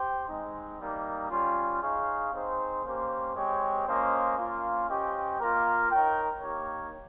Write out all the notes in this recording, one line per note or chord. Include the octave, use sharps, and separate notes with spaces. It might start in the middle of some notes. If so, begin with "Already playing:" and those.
Already playing: G4 C5 G5
G#3 C4 D#4
G3 A#3 D#4
G3 C#4 F4
D#4 G#4 C#5 F5
C4 D#4 G#4 C5
A#3 C#4 G4 C5
G#3 C4 G4 C#5 G5
A#3 C#4 F4 C5 D#5
A#3 C#4 F4
C#4 G4 C5 D#5 G5
A#3 F4 A#4
D#4 A#4 C#5 G5
A#3 D#4 G4 A#4 C#5